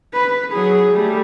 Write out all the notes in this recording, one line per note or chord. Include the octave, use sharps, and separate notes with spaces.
B4
F#3 G#4
G3 A3